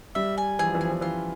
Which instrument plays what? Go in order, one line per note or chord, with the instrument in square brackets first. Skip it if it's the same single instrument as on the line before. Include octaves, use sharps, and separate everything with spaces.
[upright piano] G3 [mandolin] E5
[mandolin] G#5
[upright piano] E3 [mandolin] G#4
[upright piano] F3
E3
[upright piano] F3 [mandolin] G#4
[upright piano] E3
[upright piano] E3 [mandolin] F4